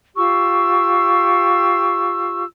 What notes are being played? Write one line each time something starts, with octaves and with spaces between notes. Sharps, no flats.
F4 G4 C#6 E6